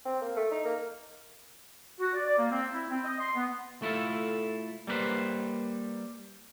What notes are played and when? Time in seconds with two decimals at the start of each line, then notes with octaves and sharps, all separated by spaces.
0.06 C4
0.21 A#3
0.36 A3
0.51 D#4
0.65 A#3
1.99 F#4
2.13 D5
2.25 D5
2.37 A#3
2.51 C4
2.72 E4
2.89 C4
3.04 D#5
3.19 C6
3.35 B3
3.82 A3 E4 F4 A4
4.87 G3 A#3 B3 B4 C5